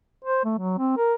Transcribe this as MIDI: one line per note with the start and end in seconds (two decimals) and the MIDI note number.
0.24 0.44 72
0.44 0.54 57
0.58 0.77 54
0.78 0.96 60
0.97 1.14 70